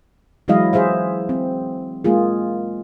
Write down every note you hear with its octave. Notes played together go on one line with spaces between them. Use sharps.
E3 F#3 G#3 E4 D#5 F5
G#4 C5 E5 F5
C4
G#3 A#3 F4 G#4